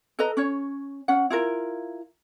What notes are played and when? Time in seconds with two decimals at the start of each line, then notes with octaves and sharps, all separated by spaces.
0.19 A4 B4 D#5 A#5
0.37 C#4 C#5
1.08 C#4 F#5
1.30 E4 F4 A#4